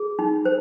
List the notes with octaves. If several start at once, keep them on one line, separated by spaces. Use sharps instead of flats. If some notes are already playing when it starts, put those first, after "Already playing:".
Already playing: G#4
D#4
C5